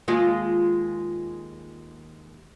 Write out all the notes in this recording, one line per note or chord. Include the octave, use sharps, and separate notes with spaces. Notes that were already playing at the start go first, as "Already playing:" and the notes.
D#2 G#3 F4